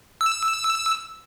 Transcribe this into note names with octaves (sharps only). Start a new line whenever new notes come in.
E6